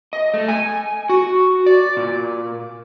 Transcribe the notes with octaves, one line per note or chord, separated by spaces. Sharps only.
D#5
A3
G#5
F#4
D5
A#2